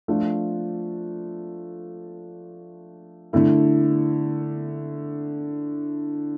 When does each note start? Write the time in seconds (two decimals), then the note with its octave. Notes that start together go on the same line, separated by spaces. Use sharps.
0.08 F3 A3 D4 F4
3.33 D3 A3 E4